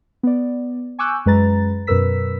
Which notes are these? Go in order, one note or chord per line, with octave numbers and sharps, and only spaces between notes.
B3 D5
G#5 C#6 D6 E6 F#6 G6
F#2 G#3 B4 A#5 A6
F#2 B2 A#4 B4 E6 B6